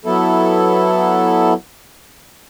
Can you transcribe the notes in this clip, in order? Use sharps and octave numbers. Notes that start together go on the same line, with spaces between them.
F#3 B3 E4 A4